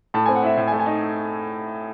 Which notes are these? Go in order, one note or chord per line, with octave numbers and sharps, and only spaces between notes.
A2 A5
C4 G#5
F#5
E4 E5
A2
G#5
A3
G#5
D#4